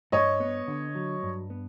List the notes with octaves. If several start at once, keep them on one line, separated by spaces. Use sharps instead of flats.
G2 C#5 D#5
B3
D3
F#3
G2
B3